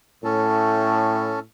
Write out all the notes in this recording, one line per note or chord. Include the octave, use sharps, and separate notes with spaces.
A2 C#4 A4